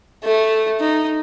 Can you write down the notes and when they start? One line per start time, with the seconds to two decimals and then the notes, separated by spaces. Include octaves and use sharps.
0.24 A3
0.80 D#4